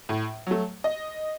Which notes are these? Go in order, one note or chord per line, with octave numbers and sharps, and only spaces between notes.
A2
F#3 A3
D#5